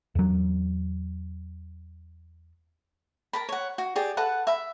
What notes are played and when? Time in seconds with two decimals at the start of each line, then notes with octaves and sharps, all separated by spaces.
0.15 E2 F#3
3.33 A#4 A5 B5
3.49 C#5 F#5
3.78 F#4
3.96 G4 G#4 D5
4.17 A4 B4 F#5 A5
4.47 E5 B5